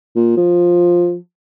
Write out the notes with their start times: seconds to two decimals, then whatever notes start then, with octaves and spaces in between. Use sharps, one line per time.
0.16 A#2
0.37 F3